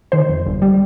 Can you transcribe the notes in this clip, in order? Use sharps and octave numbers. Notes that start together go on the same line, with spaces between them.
D#3 C5
F2
G1
G3